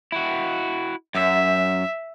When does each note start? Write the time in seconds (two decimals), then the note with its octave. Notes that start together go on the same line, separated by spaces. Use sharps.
0.12 E4 F#4
1.15 F#2 E5